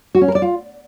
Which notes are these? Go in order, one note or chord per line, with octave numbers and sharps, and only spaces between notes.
F#4
C#4
A#4
D5
F4